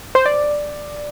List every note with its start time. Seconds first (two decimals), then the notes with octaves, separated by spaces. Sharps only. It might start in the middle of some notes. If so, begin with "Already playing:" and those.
0.15 C5
0.26 D5